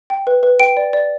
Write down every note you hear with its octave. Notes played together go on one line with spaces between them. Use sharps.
G5
B4
B4
G5 D7
D5
D5